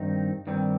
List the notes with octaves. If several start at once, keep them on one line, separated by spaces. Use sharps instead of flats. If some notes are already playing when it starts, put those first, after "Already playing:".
Already playing: G2 D#3 C4 D#4
G2 D#3 G3 C4